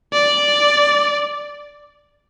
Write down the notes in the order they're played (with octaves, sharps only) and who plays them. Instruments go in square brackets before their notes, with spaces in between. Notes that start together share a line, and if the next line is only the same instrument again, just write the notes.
[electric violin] D5